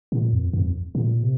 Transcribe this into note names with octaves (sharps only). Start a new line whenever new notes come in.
A#2
F2
F2
A#2
C3